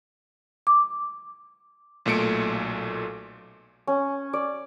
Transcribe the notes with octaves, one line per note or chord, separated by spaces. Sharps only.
D6
B1 A#2 A3 C#7 D7
C#4
D5